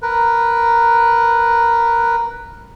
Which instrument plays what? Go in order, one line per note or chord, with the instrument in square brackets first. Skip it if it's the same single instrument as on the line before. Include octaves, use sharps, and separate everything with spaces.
[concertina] A#4 B4